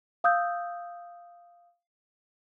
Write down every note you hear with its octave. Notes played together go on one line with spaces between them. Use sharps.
F5 D#6 E6 G6